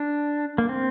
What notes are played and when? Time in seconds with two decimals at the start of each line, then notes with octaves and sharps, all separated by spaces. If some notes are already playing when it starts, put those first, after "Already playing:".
Already playing: D4
0.58 A#3
0.69 C4